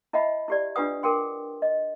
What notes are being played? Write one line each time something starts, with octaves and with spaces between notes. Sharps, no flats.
E4 D#5 E5 F#5 B5
E4 G4 D5
D4 F4 G4 B4 F#5 D#6
G#4 A#4 F#5 G5 C6
D#5